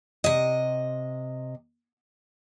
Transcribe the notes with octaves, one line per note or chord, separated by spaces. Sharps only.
C3 D#5